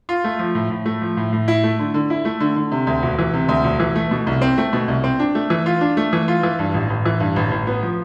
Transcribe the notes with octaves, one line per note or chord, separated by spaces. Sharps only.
F4
A3
F3
A2
A2
A3
F3
A2
A2
E4
A3
D3
D3
E4
A3
D3
D3
C3
D2
E1
E3
C3
D2
E1
E3
A3
B2
C2
C4
A3
B2
C2
C4
D4
A3
E3
F4
D4
A3
E3
F4
E3
G2
A1
A1
E3
G2
A1
A1
B3
F3